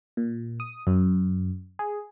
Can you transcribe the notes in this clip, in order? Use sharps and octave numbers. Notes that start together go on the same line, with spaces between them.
A#2
D#6
F#2
G#4